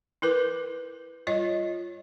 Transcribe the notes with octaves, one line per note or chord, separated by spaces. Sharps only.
E4 A#4 B4 D6
G3 F4 C#5 D#5